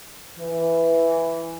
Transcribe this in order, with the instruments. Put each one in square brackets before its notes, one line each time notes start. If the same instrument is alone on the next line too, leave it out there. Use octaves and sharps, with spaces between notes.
[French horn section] E3